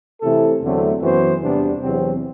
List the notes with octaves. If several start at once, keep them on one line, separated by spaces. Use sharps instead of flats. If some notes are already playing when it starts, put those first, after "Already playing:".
C3 E3 A3 E4 A4
E2 D3 F#3 A3 C4
F#2 E3 B3 F#4 C5
E2 C3 G3 B3 D4
E2 C3 F#3 C4